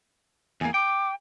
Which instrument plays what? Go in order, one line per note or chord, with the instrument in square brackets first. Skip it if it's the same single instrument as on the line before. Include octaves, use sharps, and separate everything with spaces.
[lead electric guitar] E2 A#3 [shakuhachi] G#5
[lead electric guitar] G5 [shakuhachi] D6